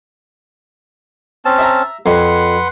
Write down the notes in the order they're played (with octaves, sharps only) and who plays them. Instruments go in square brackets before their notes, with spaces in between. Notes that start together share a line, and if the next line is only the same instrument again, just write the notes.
[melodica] C4 C#4 A5
[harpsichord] E5 A#5
[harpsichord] F2 [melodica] B4 F#5 C6